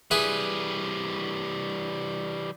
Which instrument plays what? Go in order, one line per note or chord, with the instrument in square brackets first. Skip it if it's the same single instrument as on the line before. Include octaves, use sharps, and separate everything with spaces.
[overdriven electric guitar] E3 G3 [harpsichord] G#4 B4 E5